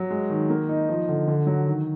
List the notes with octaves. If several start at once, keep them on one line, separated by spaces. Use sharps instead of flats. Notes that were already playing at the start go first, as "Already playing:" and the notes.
Already playing: F#3
G#3
D#3
A#3
D#4
F3
D3
D3
F#3
D#3